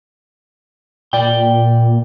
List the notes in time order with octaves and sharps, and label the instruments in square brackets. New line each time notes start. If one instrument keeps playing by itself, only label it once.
[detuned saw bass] A#2 [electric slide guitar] D5 G5